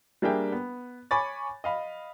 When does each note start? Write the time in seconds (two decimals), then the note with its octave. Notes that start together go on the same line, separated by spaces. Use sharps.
0.22 G3 A#3 D4 G#4 E5 G5
0.52 B3
1.11 C#5 G#5 B5 C#6 D6 A6
1.64 D#5 F5 B5